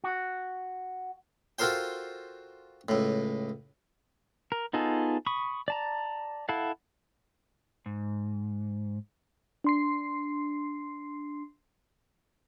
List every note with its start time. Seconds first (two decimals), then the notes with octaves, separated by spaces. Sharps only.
0.04 F#4
1.59 F4 F#4 A4 A#4 C5 G5
2.89 C#2 A2
4.52 A#4
4.73 B3 D#4 F4 G#4 A4
5.26 B5 C#6 D#6
5.68 D5 A5 A#5
6.49 E4 A4 F5 F#5
7.86 G#2
9.64 D4 C6 C7